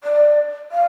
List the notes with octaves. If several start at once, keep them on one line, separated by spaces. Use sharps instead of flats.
D5
F5